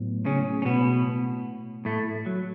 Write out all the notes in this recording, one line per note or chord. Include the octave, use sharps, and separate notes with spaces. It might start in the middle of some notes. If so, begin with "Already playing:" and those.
Already playing: A2 F#3 B3
C#3 C#4
C#4
B2 B3
A2 A3
F#3